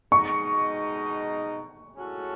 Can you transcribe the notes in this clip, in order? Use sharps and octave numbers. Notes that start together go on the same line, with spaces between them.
B2 G#3 D#4 C#6
A2 G#3 C#4 F#4 A4